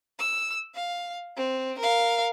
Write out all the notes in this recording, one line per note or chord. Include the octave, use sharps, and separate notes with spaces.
E6
F5
C4
A#4 F5